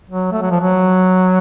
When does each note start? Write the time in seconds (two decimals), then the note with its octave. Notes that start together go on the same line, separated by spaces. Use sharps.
0.10 F#3
0.32 A3
0.42 F#3
0.51 F3
0.60 F#3